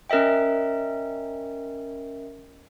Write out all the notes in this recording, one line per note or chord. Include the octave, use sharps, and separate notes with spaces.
C#4 A#4 D#5 E5 G5